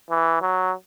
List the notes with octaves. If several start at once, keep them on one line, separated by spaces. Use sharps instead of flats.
E3
F#3